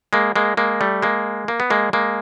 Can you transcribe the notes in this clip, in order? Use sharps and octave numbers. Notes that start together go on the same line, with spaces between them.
G#3 A#3
G#3 A#3
G#3 A#3
G3 A3
G#3 A#3
A#3
B3
G#3 A#3
G#3 A#3